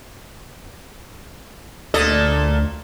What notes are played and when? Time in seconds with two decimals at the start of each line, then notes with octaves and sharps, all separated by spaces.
1.94 D2 A#2 A4 D#5